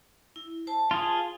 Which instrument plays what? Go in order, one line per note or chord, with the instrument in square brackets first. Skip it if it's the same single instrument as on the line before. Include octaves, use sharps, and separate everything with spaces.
[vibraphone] E4
C5 A5
[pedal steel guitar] F4 G#4